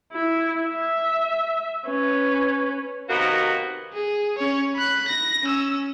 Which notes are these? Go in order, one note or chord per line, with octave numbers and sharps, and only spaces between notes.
E4
E5
C#4 B4
C3 D#3 A#3 B3 F#4
G#4
C#4 C#5
B5 F#6
A#6
C#4 E6